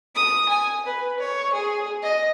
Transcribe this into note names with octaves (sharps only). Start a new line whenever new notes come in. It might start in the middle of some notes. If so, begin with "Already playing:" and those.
D#6
G#5
B4
C#5
G#4
D#5